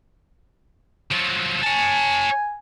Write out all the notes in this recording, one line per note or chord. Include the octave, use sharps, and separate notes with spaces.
F3 F#3
C#5 G#5 A5